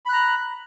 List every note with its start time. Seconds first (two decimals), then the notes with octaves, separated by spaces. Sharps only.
0.05 B5
0.09 F#6
0.12 A#5